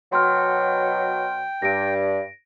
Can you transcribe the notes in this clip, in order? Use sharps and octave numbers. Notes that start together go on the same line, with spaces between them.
B2 F#3 G5 C6 F6
G2 A#6 D7